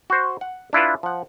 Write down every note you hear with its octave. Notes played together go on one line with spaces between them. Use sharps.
F#4 C5
F#5
D4 E4 F4 B4
F3 F#5